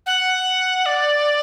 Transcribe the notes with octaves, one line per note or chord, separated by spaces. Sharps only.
F#5
D5